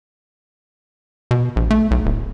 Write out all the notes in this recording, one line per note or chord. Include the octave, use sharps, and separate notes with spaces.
B2
A#1
A3
B1
D1